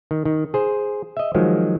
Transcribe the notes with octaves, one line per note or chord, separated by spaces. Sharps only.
D#3
D#3
G#4 C5
D#5 E5
D#3 F3 F#3 G#3